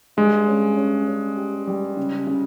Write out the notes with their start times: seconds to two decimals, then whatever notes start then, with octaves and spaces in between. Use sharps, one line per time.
0.17 G2 G#3
0.48 C#4
0.77 C#4
1.07 C#4
1.37 G4
1.67 G3
1.97 C#3
2.27 C#3